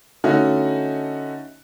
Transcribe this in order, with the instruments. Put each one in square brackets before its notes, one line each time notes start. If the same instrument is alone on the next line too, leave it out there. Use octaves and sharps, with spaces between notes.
[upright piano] D3 A3 C#4 D#4 F#4